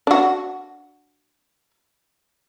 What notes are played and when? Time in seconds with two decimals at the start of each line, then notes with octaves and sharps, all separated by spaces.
0.07 D4 F#4